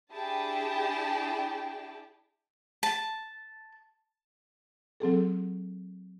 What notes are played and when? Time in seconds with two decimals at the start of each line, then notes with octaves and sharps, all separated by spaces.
0.12 D4 E4 G4 G#4 G5 A5
2.83 A5
5.00 F#3 C4 G#4 A4